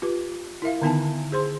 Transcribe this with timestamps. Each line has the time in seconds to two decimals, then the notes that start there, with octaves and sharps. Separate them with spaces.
0.02 F4 G4 B4
0.62 E4 A#4 E5 F5
0.82 D3 D#3 B3 D#4 G#5 A5
1.32 G#4 C5 C6